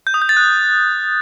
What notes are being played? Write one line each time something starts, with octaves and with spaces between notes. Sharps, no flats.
G6
D#6
G6
A6
F#6